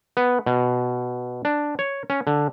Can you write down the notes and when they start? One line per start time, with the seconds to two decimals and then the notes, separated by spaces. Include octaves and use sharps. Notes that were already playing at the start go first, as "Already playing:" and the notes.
0.17 B3
0.46 B2
1.45 D4
1.79 C#5
2.10 C#4
2.27 D3